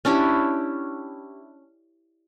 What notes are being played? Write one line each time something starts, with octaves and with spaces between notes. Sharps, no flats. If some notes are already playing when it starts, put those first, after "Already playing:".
C#4 D4 E4 G4